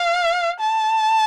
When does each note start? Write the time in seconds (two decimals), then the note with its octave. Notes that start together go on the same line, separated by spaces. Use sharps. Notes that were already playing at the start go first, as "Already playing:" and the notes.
Already playing: F5
0.60 A5